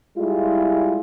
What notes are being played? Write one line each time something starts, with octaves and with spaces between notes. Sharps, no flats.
G3 G#3 E4 F4